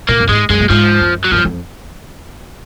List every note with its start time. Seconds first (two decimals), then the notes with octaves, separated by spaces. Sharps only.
0.09 A#2 A#3
0.20 F#2
0.29 G#2 G#3
0.49 F#2 G#3
0.60 A#2
0.70 G#2 F3
1.01 F#2
1.24 F#3
1.32 F#2 F3
1.45 F2